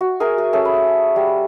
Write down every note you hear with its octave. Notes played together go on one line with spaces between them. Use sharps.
F#4
G#4 A#4 E5 G#5
G#4
C#4 G#4 A4 E5
B5
G3 F#5